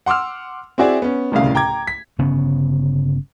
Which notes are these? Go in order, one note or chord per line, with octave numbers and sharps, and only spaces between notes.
F#5 C6 D6 E6 F6
C4 E4 F#4 G#4 D5 E5
B3 C#4
D1 C2 A2 C#3 F5
G5 A#5 D6 G#6
B6
G1 C#3 B3 C#4